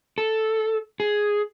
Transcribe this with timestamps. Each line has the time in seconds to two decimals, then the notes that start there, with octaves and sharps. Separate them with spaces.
0.18 A4
1.00 G#4